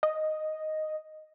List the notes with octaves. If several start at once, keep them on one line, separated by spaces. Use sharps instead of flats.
D#5